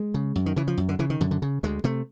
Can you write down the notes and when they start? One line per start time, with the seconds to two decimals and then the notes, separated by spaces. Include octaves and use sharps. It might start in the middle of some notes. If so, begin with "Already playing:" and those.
Already playing: G#3
0.14 C#3
0.36 F#2
0.46 D#3
0.56 C#3 E3
0.67 F3
0.77 F#2
0.89 D3
0.99 C#3 E3
1.10 D#3
1.21 F#2 D3
1.31 D3
1.42 C#3
1.63 D2 G#3
1.84 C3 A3